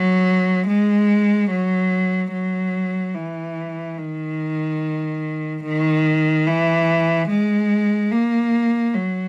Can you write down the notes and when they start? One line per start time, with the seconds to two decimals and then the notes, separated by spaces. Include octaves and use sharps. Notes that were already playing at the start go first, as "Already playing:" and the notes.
Already playing: F#3
0.67 G#3
1.51 F#3
2.33 F#3
3.15 E3
3.98 D#3
5.64 D#3
6.46 E3
7.29 G#3
8.11 A#3
8.94 F#3